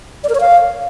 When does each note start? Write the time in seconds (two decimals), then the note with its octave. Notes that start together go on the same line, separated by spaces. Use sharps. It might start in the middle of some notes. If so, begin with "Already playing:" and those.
0.24 D5
0.29 A#4
0.35 C#5
0.40 F5